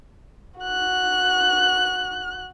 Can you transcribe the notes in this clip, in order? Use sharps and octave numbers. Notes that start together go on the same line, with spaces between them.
F#4 F#6